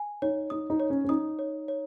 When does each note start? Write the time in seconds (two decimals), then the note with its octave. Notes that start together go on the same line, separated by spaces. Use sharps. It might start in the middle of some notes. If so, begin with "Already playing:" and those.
Already playing: G#5
0.22 D#4 C#5
0.50 D#4 D#6
0.70 D#4
0.80 C#5
0.90 C#4
1.04 C#4
1.09 D#4 D#6
1.39 C#5
1.68 C#5